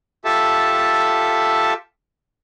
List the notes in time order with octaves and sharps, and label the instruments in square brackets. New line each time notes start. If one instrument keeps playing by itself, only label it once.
[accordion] F4 G4 A4 E5 A5